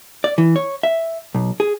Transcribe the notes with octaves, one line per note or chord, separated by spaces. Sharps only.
D5
E3
C#5
E5
B1
G#4